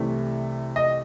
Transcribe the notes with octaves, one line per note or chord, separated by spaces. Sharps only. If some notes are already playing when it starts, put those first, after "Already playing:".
Already playing: C2 C3 E3 A3
D#5